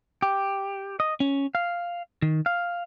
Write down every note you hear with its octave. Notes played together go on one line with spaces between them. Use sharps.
G4
D#5
C#4
F5
D#3
F5